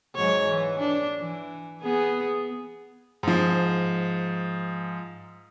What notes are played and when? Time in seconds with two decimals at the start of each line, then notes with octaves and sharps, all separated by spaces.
0.16 G#2 F#3 C#5
0.48 E3
0.80 D4
1.21 E3
1.82 B3 G#4
3.23 G#2 F3